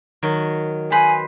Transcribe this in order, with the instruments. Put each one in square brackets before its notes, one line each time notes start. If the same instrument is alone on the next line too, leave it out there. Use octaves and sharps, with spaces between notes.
[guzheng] D#3 F#3
[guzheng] B4 C5 B5 [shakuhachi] G#5